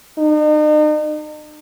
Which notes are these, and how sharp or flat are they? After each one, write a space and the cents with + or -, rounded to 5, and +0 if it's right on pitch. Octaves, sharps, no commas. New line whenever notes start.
D#4 -40